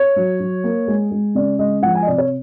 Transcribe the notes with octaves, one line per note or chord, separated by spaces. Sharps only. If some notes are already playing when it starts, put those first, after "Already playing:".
Already playing: C#5
F#3
F#3
A#3
G#3
G#3
C#3 D5
G#3 D#5
F3 F#5
G#5
D#5
C3 D5
C#5